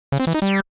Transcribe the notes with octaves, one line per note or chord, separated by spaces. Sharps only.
C#3
C4
E3
D#4
G3